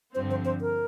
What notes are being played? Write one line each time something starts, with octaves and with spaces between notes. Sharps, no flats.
G2 D3 F3 C4 C5
C5
C5
A#4